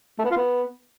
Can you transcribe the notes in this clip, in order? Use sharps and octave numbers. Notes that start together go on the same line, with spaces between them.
A3
B3
F4
B3